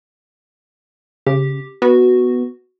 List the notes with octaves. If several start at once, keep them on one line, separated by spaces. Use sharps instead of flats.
C#3 G4
B3 F#4